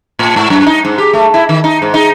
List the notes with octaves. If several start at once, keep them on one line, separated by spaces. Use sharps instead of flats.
A2
G#2
F#2
D#4
G#2
G4
A3
E4
D#3
D#4
G#2
D#4